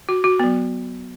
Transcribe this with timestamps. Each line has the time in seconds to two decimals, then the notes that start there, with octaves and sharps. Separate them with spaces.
0.09 F#4
0.24 F#4
0.39 F#3 B3